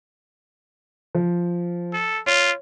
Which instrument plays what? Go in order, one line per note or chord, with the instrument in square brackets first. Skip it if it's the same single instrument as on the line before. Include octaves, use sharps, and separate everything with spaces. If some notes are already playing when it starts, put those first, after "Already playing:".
[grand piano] F3
[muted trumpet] A4
[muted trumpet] F4 [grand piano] C#5